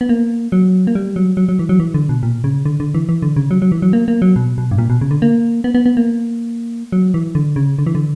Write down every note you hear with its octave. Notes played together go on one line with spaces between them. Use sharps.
B3
A#3
F#3
A#3
G3
F#3
F#3
F#3
E3
F#3
E3
D3
B2
A#2
C#3
D3
D3
E3
E3
D3
C#3
F#3
F#3
E3
F#3
A#3
A#3
F#3
B2
B2
G2
A#2
B2
C#3
D3
A#3
B3
B3
B3
A#3
F#3
E3
D3
C#3
D3
E3
D3